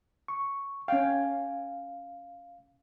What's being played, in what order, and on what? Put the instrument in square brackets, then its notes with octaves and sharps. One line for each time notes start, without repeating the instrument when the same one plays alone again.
[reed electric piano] C#6
[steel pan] C#4 G5 [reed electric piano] F5